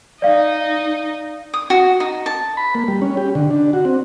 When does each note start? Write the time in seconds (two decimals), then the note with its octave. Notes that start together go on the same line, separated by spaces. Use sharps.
0.22 D#4 D5 D#5 F5
1.54 D#6
1.70 F#4
2.00 D#4
2.26 A5
2.57 B5
2.75 A#3
2.88 G3
3.02 C#4
3.17 G4
3.35 D3
3.50 D4
3.73 F#4
3.85 C4